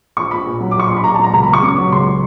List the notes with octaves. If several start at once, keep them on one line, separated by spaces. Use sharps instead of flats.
A#1 C#6
A#1 B5
A#2
F#3
D6
A#1 C#6
A#1 C6
B5
A#2 A#5
A5
F#3 A#5
C#2 A#5
B5
C#2
C#6
C#3 D6
F#3
C#2 C6